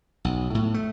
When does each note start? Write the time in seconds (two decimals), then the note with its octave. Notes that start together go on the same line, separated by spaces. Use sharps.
0.25 B1
0.55 A2
0.74 A3